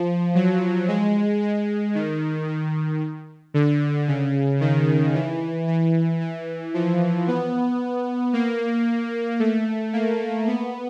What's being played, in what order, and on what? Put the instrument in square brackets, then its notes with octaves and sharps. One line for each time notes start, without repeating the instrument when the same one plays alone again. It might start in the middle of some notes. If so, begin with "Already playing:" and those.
Already playing: [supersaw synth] F3
F#3
G#3
G#3
D#3
D#3
D3
C#3
D#3
E3
E3
E3
F3
B3
A#3
A3
A#3
B3